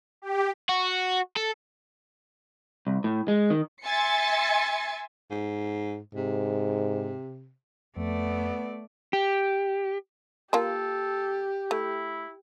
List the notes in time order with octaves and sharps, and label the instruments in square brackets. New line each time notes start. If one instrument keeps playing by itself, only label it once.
[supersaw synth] G4
[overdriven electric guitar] F#4
A4
[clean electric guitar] C2
A2
G#3
D#3
[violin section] E5 G#5 C6 A6 C#7
[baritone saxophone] G#2
[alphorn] G#2 [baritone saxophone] C3
[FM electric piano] F2 [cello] A3 D5 [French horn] B3
[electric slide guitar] G4
[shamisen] A#3 F4 A5 [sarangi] G4 [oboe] A4
[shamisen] A3 [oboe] E4